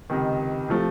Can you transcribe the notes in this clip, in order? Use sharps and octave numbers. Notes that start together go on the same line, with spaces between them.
C#2 C3 D#3
C3 F3 A3